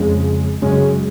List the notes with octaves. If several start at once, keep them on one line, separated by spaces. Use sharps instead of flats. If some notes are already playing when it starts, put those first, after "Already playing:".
Already playing: F2 C#3 G#3
F#2 C#3 G#3 C#4